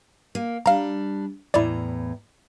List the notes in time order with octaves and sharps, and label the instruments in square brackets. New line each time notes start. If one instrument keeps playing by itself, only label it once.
[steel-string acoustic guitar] A#3
[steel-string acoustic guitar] G3 D4 [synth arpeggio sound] F5 A#5
[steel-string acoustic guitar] E2 A2 A#5 [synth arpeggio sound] E4 D5